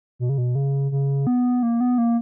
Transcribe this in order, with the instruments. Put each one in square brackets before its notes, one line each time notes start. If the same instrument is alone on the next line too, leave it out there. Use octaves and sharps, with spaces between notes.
[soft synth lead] B2
C#3
B2
C#3
C#3
B3
A#3
B3
A#3